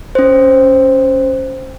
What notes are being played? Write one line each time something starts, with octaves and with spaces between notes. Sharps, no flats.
C#4 C5